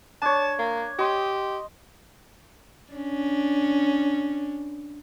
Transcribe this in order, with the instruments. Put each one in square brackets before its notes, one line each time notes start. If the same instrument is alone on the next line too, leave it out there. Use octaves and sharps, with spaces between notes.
[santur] D4 C#5 [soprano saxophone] A5
[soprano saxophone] A#3
[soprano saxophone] G4 [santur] D#5 C6
[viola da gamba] C#4 D4